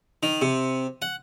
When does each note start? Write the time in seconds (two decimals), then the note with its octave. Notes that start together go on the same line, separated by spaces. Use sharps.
0.23 D#3
0.42 C3
1.02 F#5